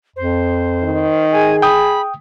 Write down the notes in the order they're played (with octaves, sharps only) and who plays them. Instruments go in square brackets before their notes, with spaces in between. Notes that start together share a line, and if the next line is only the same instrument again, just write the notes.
[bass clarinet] F2 [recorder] C5
[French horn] D#3
[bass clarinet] G#4 [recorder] G#5
[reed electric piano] G5 D#6 [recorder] B5